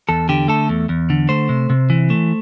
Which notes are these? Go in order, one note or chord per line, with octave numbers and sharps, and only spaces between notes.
E2 A4
D3 G4
A3 A4
E2
E2
D3
A3 C5
C3
C3
E3
A3